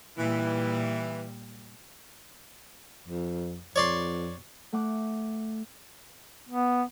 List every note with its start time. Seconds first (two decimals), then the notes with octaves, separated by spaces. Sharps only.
0.17 A#2 E3 G3
3.08 F2
3.76 F2 C#5 D5 C6
4.73 A3 F#5 D6
6.49 B3